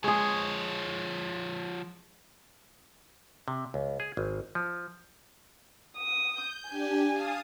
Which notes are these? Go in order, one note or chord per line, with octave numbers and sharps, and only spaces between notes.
F3 G#3 G#4 C#5
C3
C#2
G#4
G#1
F3
D#6
G6
D4 G4 G#5
F5 A5 D#6